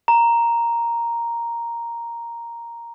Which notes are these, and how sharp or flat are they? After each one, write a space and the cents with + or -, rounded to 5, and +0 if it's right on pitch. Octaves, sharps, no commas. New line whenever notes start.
A#5 +0